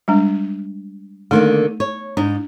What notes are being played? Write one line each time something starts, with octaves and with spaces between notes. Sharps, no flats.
G3 G#3 D4
D3 D#3 A3 A#3 D#4
C#5
G#2 D4 D#4